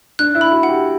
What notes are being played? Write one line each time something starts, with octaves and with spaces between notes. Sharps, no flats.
D4 F#6
E4
B5
F#4
F#5
G4